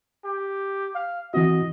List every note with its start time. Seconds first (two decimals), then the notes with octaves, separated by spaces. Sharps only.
0.24 G4
0.95 F5
1.34 E3 C4 F#4 D#5